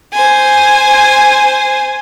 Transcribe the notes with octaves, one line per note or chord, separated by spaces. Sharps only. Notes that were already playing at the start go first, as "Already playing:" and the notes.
C5 G#5